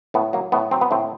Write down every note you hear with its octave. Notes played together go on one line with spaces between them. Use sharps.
A2 B3
F#3 A#3
A2 B3
F#3 C4
B3
A2 C4